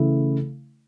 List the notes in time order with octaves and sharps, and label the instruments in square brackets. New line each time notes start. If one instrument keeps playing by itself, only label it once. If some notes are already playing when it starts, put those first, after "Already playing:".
Already playing: [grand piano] C#3 E3 A3 E4